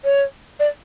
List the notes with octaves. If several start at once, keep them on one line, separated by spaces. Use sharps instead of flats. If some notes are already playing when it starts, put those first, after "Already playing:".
C#5
D5